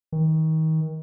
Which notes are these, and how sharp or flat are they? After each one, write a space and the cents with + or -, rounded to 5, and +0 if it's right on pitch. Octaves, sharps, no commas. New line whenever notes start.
D#3 +30